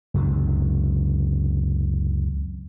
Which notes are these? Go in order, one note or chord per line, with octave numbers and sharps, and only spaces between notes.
C#2 F#2 C3 D#3